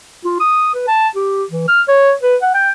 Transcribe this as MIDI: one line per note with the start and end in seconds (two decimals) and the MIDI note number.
0.25 0.35 65
0.40 0.71 87
0.74 0.84 71
0.87 1.08 81
1.15 1.44 67
1.50 1.67 52
1.68 1.81 89
1.88 2.12 73
2.22 2.36 71
2.42 2.50 78
2.54 2.71 79